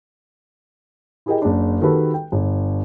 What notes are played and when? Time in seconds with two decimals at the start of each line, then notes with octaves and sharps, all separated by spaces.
1.26 E4 G4 G#4 A#4 D#5 G5
1.42 F#1 D4
1.81 D#3 F#4 G4 A4 B4
2.14 G5
2.32 G1